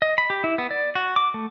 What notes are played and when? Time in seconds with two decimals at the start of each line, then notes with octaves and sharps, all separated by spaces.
0.02 D#5
0.18 B5
0.30 G4
0.44 E4
0.58 B3
0.71 D5
0.95 F#4
1.16 D6
1.34 A3